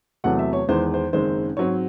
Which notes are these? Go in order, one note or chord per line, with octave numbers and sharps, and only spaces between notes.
E2 C3 F#3 A3 F#5
E5
C#5
E2 D#3 G#3 C5
C5
F#1 F#2 D#3 G#3 C4 C5
G#2 F#3 C4 C#5